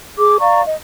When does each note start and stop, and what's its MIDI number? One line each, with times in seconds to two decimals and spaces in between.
0.18 0.38 68
0.18 0.38 86
0.39 0.61 74
0.39 0.61 77
0.39 0.61 82
0.39 0.61 85
0.66 0.77 75